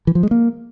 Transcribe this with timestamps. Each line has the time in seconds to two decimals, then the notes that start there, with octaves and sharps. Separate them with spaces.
0.07 E3
0.15 F3
0.23 G#3
0.31 A#3